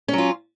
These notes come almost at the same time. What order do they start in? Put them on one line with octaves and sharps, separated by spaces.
C#4 F#3 F4